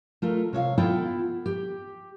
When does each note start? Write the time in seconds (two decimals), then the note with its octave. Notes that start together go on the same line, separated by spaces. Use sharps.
0.22 A3 F4 A#4
0.53 C3 C#5 E5 F5
0.78 B3 E4 F4 A4 G5
1.46 G4